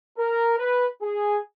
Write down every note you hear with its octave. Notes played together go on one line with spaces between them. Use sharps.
A#4
B4
G#4